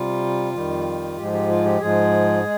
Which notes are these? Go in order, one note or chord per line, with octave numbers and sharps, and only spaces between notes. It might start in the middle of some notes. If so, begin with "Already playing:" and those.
Already playing: C3 G3 F4
F2 D#3 G3
G#2 F3 G#3 G4
G4
F4
G4
G#2 F3 G#3 G#4
G#3